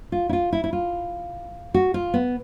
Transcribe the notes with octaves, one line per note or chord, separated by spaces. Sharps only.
F4
E4
F4
E4
E4
F4
F#4
F4
B3